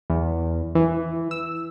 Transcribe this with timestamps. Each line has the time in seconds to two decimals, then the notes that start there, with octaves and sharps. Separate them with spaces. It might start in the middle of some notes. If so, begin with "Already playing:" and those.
0.10 E2
0.75 E3
1.31 E6